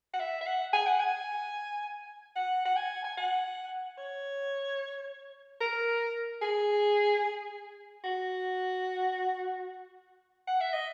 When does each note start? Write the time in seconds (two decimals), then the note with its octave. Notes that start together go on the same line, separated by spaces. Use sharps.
0.14 F#5
0.19 E5
0.41 E5
0.46 F#5
0.73 G#5
0.86 F#5
1.00 G#5
2.36 F#5
2.65 F#5
2.76 G#5
3.04 G#5
3.17 F#5
3.98 C#5
5.61 A#4
6.42 G#4
8.04 F#4
10.47 F#5
10.60 E5
10.73 D#5